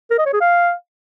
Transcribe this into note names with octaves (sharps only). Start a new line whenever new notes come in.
A#4
D#5
C#5
G#4
F5